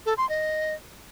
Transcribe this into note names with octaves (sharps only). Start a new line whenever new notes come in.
A4
C6
D#5